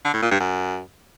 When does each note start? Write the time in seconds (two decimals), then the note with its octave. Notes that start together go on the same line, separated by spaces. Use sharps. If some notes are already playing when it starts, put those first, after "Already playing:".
0.05 D3
0.13 A2
0.22 A#2
0.31 G2
0.40 F#2